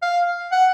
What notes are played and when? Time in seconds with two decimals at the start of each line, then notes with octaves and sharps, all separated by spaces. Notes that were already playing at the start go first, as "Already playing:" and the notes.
0.02 F5
0.52 F#5